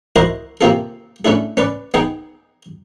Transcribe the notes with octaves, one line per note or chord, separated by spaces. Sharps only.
E4 F#4 A#4 C5 D#5
C3 A#3 C4 F4 G#4 A4
A3 C#4 D4 E4 G#4
C#4 B4 D5
B3 D#4 G#4 G5 G#5